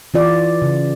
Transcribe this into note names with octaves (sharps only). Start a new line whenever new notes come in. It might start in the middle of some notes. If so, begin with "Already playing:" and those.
E3 F4 D5
C#3